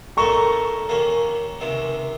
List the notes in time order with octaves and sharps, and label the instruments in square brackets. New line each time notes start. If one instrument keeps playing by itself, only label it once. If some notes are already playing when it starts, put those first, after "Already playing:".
[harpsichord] A#2 A3 C4 D#4 A#4 [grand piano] A#5 C#6
[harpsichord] D#2 D#3 A#3 C#4
C#2 C3 D#3